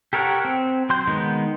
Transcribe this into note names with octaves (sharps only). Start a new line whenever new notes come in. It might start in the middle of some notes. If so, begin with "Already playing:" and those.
G4 A4 A#4 C#5 F#5
C4
F#3 C6 G6
D#3 G#3 B3 D#4